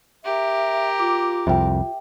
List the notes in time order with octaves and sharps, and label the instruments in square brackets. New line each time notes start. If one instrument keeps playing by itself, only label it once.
[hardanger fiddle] G4 A#4 [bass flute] E5
[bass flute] F4 [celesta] D6
[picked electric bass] C2 F2 [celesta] E5 G5